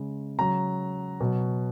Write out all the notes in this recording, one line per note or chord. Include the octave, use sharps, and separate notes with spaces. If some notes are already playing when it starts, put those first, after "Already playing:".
Already playing: C#3 G#3
C#3 F#3 A#5
B2 F#3